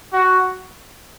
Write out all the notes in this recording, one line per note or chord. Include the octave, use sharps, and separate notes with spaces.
F#4